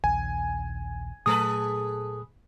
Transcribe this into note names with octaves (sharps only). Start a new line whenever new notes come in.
A#1 D#2 G#5
A#2 F#3 A3 G#4 A4 B4 D#6